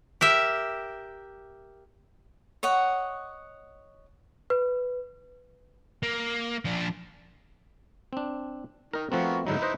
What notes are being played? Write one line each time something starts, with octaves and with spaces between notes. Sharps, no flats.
G4 A#4 E5
C#5 D#5 F#5
B4
A#3
F3 D4
C4 D4
D#3 D#4 A#4
F3 A3 B3 C4 F#4 A#4
G#2 D3 F#3 D#4 E4 A#5
B4 C5 D#5